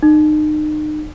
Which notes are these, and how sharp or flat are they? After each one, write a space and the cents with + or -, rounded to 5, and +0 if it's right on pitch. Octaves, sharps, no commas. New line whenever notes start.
D#4 -35